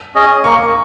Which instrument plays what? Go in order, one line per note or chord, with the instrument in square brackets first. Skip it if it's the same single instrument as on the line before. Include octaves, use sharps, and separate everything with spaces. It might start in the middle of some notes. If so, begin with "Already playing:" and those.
[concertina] C#4 G#4 D#5
[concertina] A#3 [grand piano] C#6